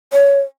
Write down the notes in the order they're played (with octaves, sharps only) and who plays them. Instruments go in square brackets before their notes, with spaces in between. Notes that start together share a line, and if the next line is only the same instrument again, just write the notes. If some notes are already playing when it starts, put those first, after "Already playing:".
[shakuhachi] C#5